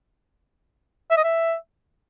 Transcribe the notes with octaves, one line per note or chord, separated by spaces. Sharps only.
E5
D#5
E5